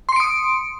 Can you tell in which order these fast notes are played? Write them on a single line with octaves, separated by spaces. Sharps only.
C6 C#7 D7 D#6